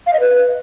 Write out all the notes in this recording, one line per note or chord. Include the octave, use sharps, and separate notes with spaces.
F5
D#5
B4